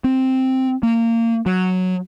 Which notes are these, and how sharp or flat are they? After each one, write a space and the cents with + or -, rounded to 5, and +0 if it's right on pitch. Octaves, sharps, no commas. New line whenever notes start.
C4 +0
A#3 -25
F#3 -5